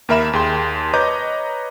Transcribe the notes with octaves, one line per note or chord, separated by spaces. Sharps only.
D#2 A#3 A#4 E5 B5 E7
D#2 G#4 G5 C6
B4 C#5 D#5 A#5 D6 G6